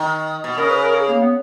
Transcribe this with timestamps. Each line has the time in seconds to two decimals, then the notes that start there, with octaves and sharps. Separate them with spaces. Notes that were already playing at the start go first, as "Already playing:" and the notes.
Already playing: D#3
0.44 B2
0.58 C#3 A#4
0.70 B4
0.84 A#4
0.95 G#4
1.08 A#3
1.21 B3